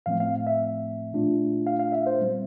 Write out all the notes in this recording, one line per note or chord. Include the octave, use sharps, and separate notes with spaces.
A2 F3 A3 C4 F5
F5
E5
A#2 A3 D4 F4
F5
F5
E5
C5
A#2 G3 C4